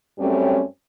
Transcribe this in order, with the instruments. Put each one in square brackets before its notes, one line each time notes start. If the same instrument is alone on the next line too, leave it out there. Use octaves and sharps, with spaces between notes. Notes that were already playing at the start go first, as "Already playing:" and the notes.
[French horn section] F#2 G3 A3 C4 C#4